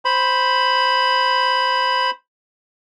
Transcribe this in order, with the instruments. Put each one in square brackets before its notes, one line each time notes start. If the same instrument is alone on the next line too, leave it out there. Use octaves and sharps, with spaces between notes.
[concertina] C5 B5